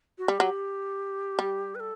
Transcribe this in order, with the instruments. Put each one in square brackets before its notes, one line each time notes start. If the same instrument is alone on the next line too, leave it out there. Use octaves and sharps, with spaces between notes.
[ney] F#4
[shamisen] G3 [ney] G4
[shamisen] F#3
G3
[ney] B4
A4